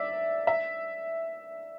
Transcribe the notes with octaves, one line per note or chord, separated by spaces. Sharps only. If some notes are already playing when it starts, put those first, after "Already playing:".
Already playing: D5 E5
E5